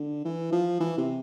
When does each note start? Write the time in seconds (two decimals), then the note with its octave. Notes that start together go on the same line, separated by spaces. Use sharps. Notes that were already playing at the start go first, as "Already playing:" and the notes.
Already playing: D3
0.25 E3
0.52 F3
0.80 E3
0.98 C3